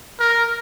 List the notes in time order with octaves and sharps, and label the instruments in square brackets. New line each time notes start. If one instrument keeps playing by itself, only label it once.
[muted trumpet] A#4